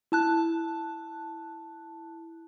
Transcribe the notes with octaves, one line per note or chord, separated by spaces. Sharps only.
E4 A5 F#6